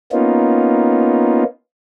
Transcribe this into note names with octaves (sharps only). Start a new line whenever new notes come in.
A#3 B3 C#4 D#4 F4